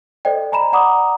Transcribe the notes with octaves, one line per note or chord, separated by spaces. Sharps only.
A4 C5 D5 D#5 G5
G#5 A#5 B5 E7
D5 F#5 A#5 B5 D6 D#6